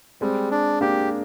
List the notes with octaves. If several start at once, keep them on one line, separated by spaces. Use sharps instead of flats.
G3 G#3 C4
D4
A#3 D4 G4